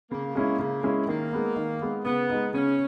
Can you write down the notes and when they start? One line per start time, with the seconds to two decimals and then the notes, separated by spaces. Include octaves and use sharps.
0.11 C#3 A#3
0.35 G#3 C#4 E4
0.59 C#3
0.84 G#3 C#4 E4
1.08 D#3 A#3
1.33 G#3 B3
1.56 D#3
1.82 G#3 B3
2.05 C#3 B3
2.30 G#3 D#4
2.53 C#3 C#4